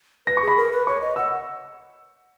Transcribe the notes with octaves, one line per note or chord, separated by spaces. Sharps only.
B4 A#6
C#6
G#4
B5
A#4
B4
C#5 C#6
D#5
F#5 E6